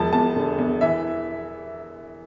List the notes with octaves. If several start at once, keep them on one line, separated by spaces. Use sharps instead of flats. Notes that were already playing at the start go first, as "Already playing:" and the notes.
Already playing: E1 F3 A5
E2 A5
D3
E2
E3 E5